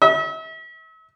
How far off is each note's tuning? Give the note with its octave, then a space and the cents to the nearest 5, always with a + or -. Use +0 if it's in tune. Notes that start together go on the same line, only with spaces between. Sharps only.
E5 -40